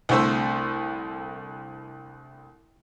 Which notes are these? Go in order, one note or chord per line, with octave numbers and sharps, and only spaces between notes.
C2 D3 A3 C5 E6